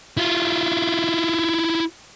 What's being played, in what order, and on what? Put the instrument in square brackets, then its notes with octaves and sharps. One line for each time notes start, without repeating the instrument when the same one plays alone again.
[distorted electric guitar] E4 F4